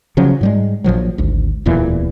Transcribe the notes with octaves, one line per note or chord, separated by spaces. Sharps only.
C#3 F3 F#3 C#4
G#2 G3 G#3
A#1 A#2 F3 F#3
G#1 D2
D1 E2 A#2 E3